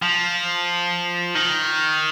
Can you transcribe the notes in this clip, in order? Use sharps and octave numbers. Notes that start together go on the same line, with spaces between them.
F3
D#3